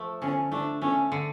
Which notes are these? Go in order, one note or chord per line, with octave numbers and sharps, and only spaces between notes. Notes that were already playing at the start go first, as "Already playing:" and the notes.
Already playing: F3 A3
D3 C#4
A3 D4
A3 C#4
D3